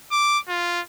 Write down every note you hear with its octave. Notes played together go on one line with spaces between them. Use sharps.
D6
F4